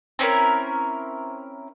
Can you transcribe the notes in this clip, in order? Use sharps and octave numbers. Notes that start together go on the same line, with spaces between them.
C4 C#4 E4 A#4